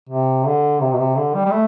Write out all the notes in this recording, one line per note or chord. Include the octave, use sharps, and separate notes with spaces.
C3
D3
C3
B2
C3
D3
G3
G3
A3